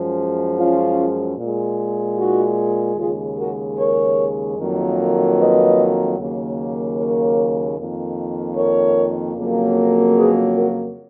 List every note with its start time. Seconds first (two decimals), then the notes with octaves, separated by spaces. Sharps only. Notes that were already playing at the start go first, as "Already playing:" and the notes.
Already playing: F#2 F3 G#3
0.58 C#4 F4
1.37 A#2 G#3
2.18 D#4 F#4
2.97 D#2 C#3 G#3 F4 G#4
3.37 F#4 A#4
3.77 A#4 C#5
4.58 F2 D#3 F#3 A#3
5.37 B4 D#5
6.17 D#2 C#3 F#3 A#3
6.97 A#4 C#5
7.77 F2 D#3 A#3
8.56 A#4 C#5
9.36 F2 C#3 F#3 A#3
10.16 G#4 B4
10.56 F#4 A#4